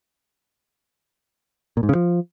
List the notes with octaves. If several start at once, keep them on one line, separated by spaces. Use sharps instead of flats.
A#2
G#2
C#3
F3